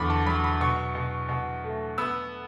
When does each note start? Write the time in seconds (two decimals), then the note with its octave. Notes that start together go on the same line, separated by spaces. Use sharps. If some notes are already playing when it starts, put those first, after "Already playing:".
Already playing: E2 D3 F#3 B5 C#6 D6
0.10 A5
0.26 F#3 B5
0.44 B5
0.61 B2 C#6
0.95 B2
1.29 B2
1.64 A3
1.98 B3 E6